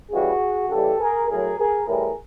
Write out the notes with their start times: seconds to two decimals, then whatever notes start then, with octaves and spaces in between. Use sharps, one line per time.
0.10 C#3 E3 G3 F#4 G#4
0.70 C#3 E3 G3 G4 A4
0.99 G#4 A#4
1.28 A2 F#3 G#4 A#4
1.58 G#4 A#4
1.87 A2 E3 G3 G#4 A#4